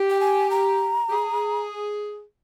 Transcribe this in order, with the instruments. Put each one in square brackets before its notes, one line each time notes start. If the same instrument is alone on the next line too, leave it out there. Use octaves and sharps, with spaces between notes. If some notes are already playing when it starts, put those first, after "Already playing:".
Already playing: [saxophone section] G4
[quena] G5
G#5
A#5
[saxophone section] G4
G#4